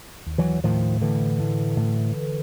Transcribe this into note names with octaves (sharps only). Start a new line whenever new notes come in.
D#2
E3 F#3
A2 D#3 F3
A2 D3 E3
A2
A2